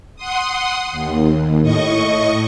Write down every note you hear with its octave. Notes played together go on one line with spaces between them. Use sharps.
F#5 C6 D#6
D#2
A2 D#5 C#6